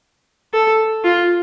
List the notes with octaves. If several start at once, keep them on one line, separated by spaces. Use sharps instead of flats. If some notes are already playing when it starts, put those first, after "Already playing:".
A4
F4